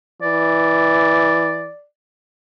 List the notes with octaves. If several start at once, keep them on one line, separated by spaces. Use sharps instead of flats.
E3 D5